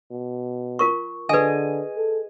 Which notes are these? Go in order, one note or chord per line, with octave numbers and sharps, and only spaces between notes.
B2
F4 A#4 C#6
D3 G#4 B4 D#5 G#5
A4